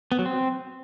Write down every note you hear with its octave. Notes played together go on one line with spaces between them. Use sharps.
B3
F#3
C4